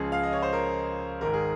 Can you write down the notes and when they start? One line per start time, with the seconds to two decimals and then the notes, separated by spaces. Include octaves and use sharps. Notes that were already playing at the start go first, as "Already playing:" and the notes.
Already playing: C#2 C#3 F3 G#4
0.12 F5
0.23 D#5
0.33 C#5
0.42 C5
0.53 A#4
1.21 G#1 G#2 D#3 A#4
1.34 G#4